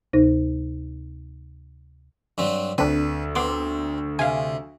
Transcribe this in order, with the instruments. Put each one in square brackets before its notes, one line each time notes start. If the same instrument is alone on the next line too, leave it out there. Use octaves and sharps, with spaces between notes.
[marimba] D2 C3 D#4 C5 A#6
[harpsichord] G2 F#3 C4
[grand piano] D2 [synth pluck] C4 D4 [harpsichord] B4
[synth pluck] B3 C6 D6 [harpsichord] C4
[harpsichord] C3 [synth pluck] F5 G#5